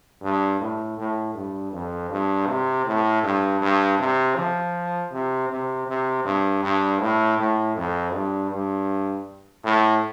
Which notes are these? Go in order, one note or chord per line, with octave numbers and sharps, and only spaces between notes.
G2
A2
A2
G2
F2
G2
C3
A2
G2
G2
C3
F3
C3
C3
C3
G2
G2
A2
A2
F2
G2
G2
A2